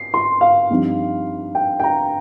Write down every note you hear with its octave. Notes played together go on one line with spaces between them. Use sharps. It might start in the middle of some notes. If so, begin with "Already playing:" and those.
Already playing: C7
C6
F5
G2 F3 C4 D#4
G5
G5
A#5